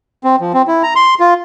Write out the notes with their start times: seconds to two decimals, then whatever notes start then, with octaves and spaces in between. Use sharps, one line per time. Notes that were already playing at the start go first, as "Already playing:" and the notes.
0.24 C4
0.41 F3
0.54 C4
0.68 E4
0.83 A#5
0.95 C6
1.20 F4